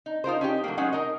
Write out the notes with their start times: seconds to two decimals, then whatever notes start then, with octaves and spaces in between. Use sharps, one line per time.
0.06 D#4
0.24 D#4 F4 A#4 C5
0.41 C#4 D#4 G4
0.64 F#3 A3 A#3
0.77 F#3 G#3 C#4 D#4 F#5
0.93 D#4 A#4 D#5